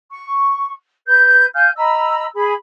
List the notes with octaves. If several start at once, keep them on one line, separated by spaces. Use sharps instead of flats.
C#6
B4 G6
F5 G#5 F6 G6
D#5 A#5 B5 E6
G#4 B5